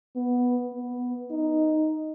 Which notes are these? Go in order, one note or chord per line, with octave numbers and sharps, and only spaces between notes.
B3
B3
D#4